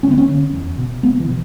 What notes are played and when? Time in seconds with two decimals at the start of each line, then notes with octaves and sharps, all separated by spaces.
0.03 D2 C#4
0.11 B3
0.18 C#4
0.28 D3
0.53 E2
0.78 B2
1.03 C#2 B3
1.20 E3
1.29 B2